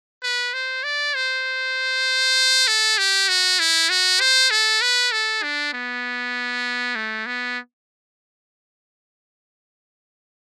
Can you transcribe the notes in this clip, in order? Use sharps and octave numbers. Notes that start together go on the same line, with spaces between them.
B4
C5
D5
C5
A4
G4
F#4
E4
F#4
C5
A4
B4
A4
D4
B3
A3
B3